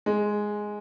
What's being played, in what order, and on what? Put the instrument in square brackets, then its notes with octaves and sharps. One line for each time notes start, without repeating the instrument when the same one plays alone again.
[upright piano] G#3